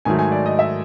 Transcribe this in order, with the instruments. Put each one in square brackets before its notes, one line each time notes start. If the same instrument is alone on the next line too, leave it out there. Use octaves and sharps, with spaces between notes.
[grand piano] G#2 D#3 F#3 A3 [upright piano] G#5
[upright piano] G#5
D5
D#5
E5